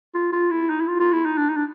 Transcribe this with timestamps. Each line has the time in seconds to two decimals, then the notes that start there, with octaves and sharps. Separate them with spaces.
0.14 F4
0.33 F4
0.50 E4
0.69 D#4
0.81 E4
0.87 F4
1.00 F4
1.13 E4
1.25 D#4
1.37 D4
1.49 D#4
1.56 D4